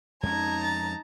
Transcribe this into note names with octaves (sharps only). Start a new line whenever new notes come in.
F2 G#3 C#4 D#4 A5 A#5 G#6
A6